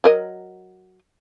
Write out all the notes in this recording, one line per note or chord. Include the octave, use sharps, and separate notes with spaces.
F#3 A#4 D#5